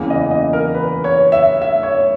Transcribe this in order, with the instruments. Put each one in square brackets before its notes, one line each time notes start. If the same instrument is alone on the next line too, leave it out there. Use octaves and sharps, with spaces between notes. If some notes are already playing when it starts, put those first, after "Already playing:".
Already playing: [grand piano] E2 C#3 E3 A#3
D#5
D#5
A#4
B4
C#5
E5
E5
C#5